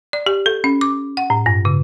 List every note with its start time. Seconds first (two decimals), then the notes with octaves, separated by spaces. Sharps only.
0.13 D5
0.26 G4
0.46 A4
0.64 C#4
0.81 D6
1.17 F#5
1.30 A2
1.46 G2
1.65 C#3